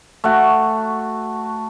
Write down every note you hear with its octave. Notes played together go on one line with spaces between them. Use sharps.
A3 F#4